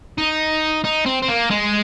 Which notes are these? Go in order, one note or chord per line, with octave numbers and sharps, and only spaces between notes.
D#4
D#4
C4
C4
A#3
G#3